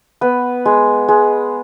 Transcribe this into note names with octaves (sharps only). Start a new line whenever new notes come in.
B3 B4
G#3
G#3